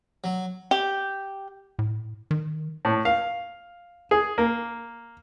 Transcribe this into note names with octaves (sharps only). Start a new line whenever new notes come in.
F#3
G4
A2
D#3
A2
F5
G#4
A#3